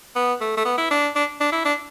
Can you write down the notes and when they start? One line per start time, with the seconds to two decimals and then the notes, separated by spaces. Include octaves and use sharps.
0.16 B3
0.41 A3
0.57 A3
0.65 B3
0.78 E4
0.91 D4
1.16 D4
1.40 D4
1.52 E4
1.65 D4